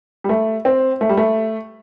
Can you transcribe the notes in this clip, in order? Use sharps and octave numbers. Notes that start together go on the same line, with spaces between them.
G3
A3
C4
A3
G3
A3